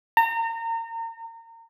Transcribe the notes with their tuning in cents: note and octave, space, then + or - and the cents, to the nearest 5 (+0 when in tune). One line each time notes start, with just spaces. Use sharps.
A#5 -35